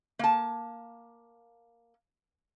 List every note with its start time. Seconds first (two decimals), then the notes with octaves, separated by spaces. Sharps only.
0.19 A#3 A5